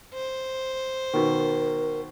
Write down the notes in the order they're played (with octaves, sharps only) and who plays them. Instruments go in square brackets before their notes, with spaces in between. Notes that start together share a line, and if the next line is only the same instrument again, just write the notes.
[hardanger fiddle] C5
[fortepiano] B2 D#3 [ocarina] A#4